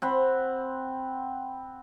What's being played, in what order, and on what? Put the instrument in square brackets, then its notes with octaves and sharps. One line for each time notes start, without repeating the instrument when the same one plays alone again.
[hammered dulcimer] C4 F#5 B5